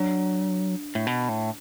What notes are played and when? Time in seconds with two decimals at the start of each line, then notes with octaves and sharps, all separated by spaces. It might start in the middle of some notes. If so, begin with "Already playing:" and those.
Already playing: F#3 D4
0.95 A2
1.07 B2
1.29 A2